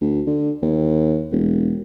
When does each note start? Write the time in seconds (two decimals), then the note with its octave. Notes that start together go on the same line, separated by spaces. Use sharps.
0.01 D2
0.27 D3
0.62 D#2
1.32 E1